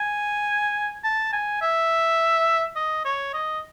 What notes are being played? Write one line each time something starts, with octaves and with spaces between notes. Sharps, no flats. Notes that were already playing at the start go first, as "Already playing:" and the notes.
Already playing: G#5
A5
G#5
E5
D#5
C#5
D#5